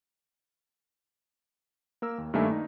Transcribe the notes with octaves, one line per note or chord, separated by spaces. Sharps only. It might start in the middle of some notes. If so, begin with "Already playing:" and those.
A#3 A#4 E6
D#2
G2 D#3 A3 A#3 E5 G#5
D#4